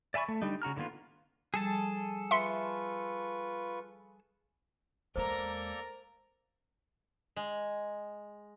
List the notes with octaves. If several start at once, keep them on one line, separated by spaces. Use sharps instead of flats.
D5 E5 G#5 B5 C#6
A3
D3 G3 D4 D#4
C#3 F#4 A#5 F6
D3 D#3 A#3 B3 F4
F3 G3 G#4 A4 A5
F4 B4 E5 C6 C#6 C#7
E2 G#3 A#3 A4 A#4 C5 D5 A#5
G#3